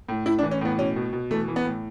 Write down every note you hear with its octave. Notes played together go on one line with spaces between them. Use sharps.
A2
A2 E4
D4
E3
C#4
A2 B3
B2 C#4
B2
B2
E3 A3
E3
B3
A2